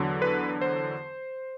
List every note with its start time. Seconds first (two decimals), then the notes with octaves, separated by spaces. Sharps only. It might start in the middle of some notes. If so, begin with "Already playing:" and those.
Already playing: E2 D3 F#3
0.22 B4
0.61 C5